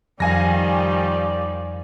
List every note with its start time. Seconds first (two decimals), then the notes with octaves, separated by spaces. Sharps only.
0.20 F2 D#3 F3 G3 D5 F5 G#5 A#6